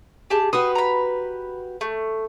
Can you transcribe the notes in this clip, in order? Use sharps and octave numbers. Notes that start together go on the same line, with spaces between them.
G4 G#4 A5
F#4 G4 B4 C6 D#6
A#5 B5
A3